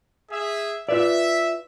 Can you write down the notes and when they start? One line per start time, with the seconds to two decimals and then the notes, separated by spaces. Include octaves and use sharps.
0.31 G#4 E5
0.89 F4 B4 D5 E5